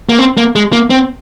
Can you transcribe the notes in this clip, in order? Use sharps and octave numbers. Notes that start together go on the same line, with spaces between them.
A#3
C4
A#3
G#3
A#3
C4